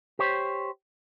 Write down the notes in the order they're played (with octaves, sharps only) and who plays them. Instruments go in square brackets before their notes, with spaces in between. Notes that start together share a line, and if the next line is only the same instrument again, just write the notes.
[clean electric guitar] G4 C5 C#5